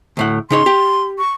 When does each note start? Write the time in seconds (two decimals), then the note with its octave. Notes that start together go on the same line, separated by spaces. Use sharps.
0.17 D2 A2 F#5
0.50 C#3 D#4 C#5 C6
0.66 G4
1.18 C#6